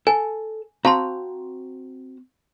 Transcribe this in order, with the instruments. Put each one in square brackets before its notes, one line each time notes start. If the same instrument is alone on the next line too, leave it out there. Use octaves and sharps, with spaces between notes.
[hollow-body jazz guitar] A4 [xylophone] G#5
[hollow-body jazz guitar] C4 F#4 A#5 [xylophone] F5 A5 C6